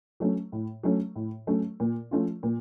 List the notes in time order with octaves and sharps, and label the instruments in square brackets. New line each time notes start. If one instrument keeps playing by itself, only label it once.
[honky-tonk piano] F#3 A3 C#4
A2
F#3 A3 C#4
A2
F#3 A3 C#4
A#2
F3 A3 C#4 F4
A#2